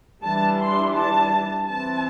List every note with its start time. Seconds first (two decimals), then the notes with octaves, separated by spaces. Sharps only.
0.25 E3 G3 D4 A5
0.61 C6
0.96 A5
1.68 E3 C4 A5